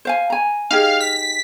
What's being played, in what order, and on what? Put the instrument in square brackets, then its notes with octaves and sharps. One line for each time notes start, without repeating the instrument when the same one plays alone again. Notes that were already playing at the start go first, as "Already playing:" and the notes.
[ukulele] C5 F5 G#5
G#5 A#5
[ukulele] D#4 G4 G#4 [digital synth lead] F5
[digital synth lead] B6